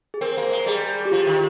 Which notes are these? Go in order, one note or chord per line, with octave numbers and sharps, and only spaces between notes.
G#4
C4 A#4
A#3
G#3
G3 G#4
G4
F3 F4
D#3